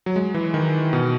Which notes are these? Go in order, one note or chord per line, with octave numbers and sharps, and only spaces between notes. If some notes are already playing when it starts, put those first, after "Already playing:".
F#3
G#3
E3
D#3
B2